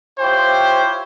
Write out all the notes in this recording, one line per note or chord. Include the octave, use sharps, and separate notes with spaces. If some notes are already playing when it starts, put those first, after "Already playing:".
E4 F4 G4 C5 C#5 G5